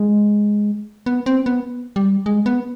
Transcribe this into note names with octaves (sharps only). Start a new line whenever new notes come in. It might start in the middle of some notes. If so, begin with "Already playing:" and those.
Already playing: G#3
B3
C4
B3
G3
G#3
B3